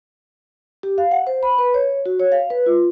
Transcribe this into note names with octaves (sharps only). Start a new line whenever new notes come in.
G4
F5
F#5
C5
B5
B4
C#5
F#4
C#5
F5
B4
F4